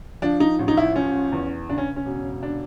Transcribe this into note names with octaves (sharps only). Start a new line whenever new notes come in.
F3 D4
D#4
A1
D#4
E4
F3 C#4
E2
C#3 D4
C#4
C#4
E1
D3 D4